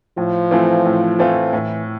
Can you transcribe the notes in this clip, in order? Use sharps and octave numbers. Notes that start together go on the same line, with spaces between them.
A2 F3
E3 A3 C4 F4
A2
E3 A3 C4 F4
A2 E3